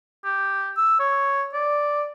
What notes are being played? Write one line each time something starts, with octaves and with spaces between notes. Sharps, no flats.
G4
E6
C#5
D5